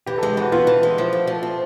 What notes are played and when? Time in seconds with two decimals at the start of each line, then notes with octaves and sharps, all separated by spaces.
0.06 E3 G4
0.18 G#3 A4
0.29 G4
0.37 E3 F#4
0.52 B3 F4
0.67 E3
0.83 G#3
0.98 F3
1.13 A3
1.27 F3
1.43 C4